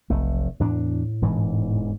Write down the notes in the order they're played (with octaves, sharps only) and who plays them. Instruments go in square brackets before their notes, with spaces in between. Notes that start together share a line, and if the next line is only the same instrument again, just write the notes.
[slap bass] F1 A3 [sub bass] B1
[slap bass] E2 D4 [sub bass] A2
[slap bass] E1 G#2 E3